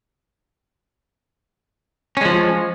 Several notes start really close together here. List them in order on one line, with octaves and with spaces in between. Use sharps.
C#4 G#3 F3